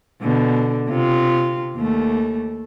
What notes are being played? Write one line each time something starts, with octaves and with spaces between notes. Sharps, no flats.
B2 D3
C3 F4
D#2 A3